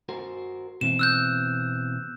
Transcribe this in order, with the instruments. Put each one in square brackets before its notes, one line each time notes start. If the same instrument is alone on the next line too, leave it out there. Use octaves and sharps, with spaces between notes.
[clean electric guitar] F#4 A#4 C5
[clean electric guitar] B2 E3 C4 [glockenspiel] E7
[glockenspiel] E6 F#6 G6